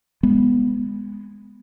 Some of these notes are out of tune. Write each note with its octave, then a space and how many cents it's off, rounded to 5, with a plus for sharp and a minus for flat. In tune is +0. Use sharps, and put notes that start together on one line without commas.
G#3 -10 B3 +0